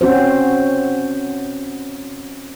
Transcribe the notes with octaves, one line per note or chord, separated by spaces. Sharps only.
C4 C#4 F#4 C5